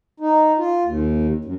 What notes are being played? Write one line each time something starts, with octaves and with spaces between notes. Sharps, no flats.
D#4
F4
D#2
F#2